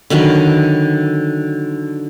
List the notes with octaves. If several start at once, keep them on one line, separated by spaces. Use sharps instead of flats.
D3 D#3 F#3 B4